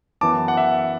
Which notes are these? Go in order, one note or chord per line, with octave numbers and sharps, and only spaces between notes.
F#2 E3 B3 A5 D6
F#5
E5